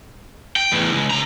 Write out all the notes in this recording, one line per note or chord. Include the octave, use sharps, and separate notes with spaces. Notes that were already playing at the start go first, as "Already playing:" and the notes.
G5
E2 A2
C#2
C#3 A#5